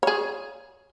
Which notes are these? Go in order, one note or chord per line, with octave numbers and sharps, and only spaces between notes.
G#4 C#5